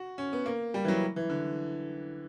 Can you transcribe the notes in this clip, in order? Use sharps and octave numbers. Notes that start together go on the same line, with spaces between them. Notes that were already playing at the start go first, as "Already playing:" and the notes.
Already playing: F#4
C#4
B3
A#3
G3
E3
F#3
E3
D3